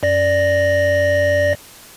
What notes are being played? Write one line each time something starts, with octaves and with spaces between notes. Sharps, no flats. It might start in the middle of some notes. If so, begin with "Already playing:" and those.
F#2 D5 A#6